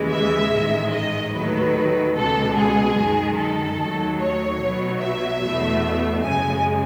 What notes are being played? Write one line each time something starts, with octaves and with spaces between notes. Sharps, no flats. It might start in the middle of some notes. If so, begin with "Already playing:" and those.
Already playing: D#2 C#3 E3 G#3
E5
A1 G#2 D#3 G#3
D#5
D#2 D#3 F#3 A3 B4
C#2 B2 G#3 A4
G#4
F#2 D#3 G#3
A4
D#2 D#3 F#3 A3
C#5
B1 B2 F#3
E5
E2 B2 A3
F#2 C#3 G#3 G#5